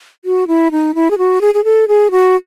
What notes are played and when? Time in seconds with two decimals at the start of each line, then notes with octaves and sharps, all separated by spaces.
0.25 F#4
0.47 E4
0.71 D#4
0.95 E4
1.11 G#4
1.18 F#4
1.41 G#4
1.54 G#4
1.64 A4
1.88 G#4
2.11 F#4